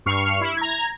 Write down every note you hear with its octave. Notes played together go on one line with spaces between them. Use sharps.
G2 C#6 F6 C7
E4
A#5 G#6